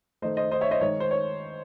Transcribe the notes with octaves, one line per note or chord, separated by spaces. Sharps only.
D#3 A3 C5 D#5
C5 D#5
C5 D#5
C#5 E5
C5 D#5
D#3 G#3 C#5
C5
C#5